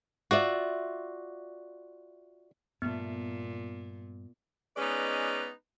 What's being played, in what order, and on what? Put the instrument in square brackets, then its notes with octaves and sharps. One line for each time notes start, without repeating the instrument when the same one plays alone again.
[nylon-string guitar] F4 D5 E5 [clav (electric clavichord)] F#4
[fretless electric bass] G2 A3 [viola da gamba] A#2 [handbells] B3
[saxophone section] G#3 B3 C#4 D#4 B4 D5